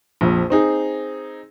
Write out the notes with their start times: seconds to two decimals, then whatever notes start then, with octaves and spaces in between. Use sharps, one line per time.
0.21 A#1 F2
0.50 C4 D#4 G#4